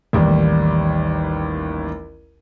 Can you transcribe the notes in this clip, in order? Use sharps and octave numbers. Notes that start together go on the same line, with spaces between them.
A1 D#2 G3